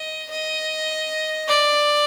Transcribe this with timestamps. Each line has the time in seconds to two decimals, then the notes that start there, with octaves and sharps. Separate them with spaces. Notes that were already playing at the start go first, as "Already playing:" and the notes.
Already playing: D#5
0.30 D#5
1.47 D5